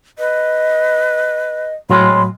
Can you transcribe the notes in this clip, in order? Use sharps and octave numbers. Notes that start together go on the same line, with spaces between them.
B4 D#5
A2 F#3 G#3 C4 F4 C#5 B5